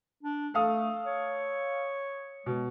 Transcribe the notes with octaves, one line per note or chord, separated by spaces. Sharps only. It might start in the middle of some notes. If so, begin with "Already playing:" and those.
D4
A3 A4 F5 D#6
C#5
B2 G#3